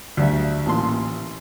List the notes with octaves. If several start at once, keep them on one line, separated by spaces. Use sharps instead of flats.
D2 G3 E5
A1 A#2 A5 C6